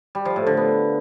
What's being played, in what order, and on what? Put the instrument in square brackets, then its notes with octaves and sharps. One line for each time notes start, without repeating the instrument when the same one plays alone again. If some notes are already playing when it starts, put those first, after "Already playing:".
[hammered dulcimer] G3
F3
A2
D3
B3